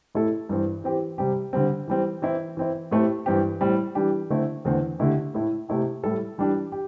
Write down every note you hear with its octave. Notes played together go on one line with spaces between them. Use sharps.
A2 A3 E4 A4
G2 E3 C4
E3 C4 G4
C3 G3 C4 G4
D3 G3 C4
E3 G3 C4
E3 C4 E4
E3 C4 E4
A2 A3 C4 G4
G2 E3 C4 G4
A2 G3 C4 G4
E3 G3 D4 G4
D3 A3 C4 E4
E2 D3 A3 C4
D3 A3 E4 G4
A2 A3 E4
C3 A3 E4 G4
A2 G3 E4 A4
E3 G3 D4 G4
G4